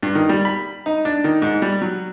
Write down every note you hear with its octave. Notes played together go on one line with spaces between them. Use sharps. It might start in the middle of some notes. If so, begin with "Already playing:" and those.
G2
D#3
G3
B5
D#4
D4
D#3
G#2
G3
F#3